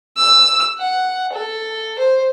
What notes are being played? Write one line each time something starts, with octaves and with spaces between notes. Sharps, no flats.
E6
F#5
A4
C5